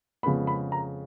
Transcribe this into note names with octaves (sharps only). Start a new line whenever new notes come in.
F2 C#3 G#3 B3 B5
B5
A#5